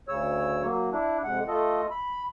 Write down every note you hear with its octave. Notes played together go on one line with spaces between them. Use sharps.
D2 C#3 C#5 E6
F#3 A#3
D4 E4
F2 C3 G#3 F#5
A3 F4 A4 D#5
B5